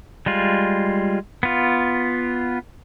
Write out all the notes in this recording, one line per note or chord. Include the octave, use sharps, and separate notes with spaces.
G3 G#3 F4
B3 F4